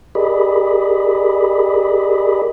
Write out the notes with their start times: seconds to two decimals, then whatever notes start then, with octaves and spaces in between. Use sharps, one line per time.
0.15 G4 G#4 A#4 D5 D#5 B5